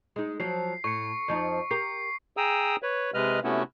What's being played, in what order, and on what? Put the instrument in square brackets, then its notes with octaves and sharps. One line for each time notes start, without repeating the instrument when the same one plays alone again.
[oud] G#3 D#4
[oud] F3 F#3 [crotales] C7
[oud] A2 [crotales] C#6 C#7
[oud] F2 F3 D#4
[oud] G4 A#4 [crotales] C7
[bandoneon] G#4 G5 A#5 D#6 E6
B4 C#5
C3 G#3 B4 D#5 F6
C3 A3 B3 C#4 E4 F#4